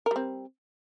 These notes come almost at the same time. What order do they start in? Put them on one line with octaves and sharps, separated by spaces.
A#4 G3 C4